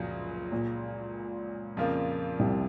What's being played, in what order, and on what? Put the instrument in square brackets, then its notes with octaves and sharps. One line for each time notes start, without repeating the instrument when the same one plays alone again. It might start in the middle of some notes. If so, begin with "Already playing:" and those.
Already playing: [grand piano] C#2 C#3 F#3 [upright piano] F#2 A#2 F3 G#3
[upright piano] A#2
[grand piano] F2 C#3 F3 A#3 F4
[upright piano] C2 C3